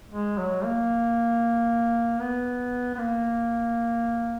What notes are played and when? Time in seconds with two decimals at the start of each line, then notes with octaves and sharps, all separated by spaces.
0.12 G#3
0.38 F#3
0.64 A#3
2.21 B3
2.95 B3
2.99 A#3